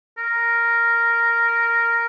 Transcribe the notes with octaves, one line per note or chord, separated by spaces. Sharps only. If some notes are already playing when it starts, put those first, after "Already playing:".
A#4